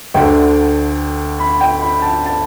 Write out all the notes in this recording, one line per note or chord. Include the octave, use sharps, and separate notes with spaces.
D2 D3 G5
B5
G5
B5
A5
A5